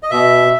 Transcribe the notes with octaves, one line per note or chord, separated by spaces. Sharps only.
D#5
B2 E5